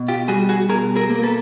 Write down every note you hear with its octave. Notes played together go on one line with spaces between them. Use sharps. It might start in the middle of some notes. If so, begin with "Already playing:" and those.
Already playing: B2
F4 G4
G3 F#4 G#4
F#4 G#4
B2 G#4 A#4
G#4 A#4
A#3
A#4
A4 B4